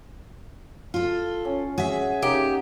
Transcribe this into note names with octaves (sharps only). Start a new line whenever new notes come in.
F4 A4
C#4
F#4 G#4 E5
A#3 C#4 D#4 G4